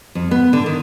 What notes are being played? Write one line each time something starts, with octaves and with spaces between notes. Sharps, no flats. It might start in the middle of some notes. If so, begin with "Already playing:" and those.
F2
B3
D3
D#3